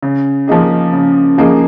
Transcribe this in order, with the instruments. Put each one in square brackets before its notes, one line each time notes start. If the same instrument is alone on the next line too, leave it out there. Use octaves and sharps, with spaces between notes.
[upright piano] C#3
F3 A#3 D#4 G#4
C#3
F3 A#3 D#4 G#4